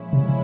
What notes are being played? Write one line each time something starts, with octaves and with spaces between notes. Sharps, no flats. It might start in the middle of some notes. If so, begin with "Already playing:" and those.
Already playing: A#2 F3 G#3 C#4 E4
C3